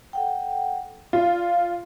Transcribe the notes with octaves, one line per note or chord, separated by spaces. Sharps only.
A4 F#5 G5
F4 D5 F5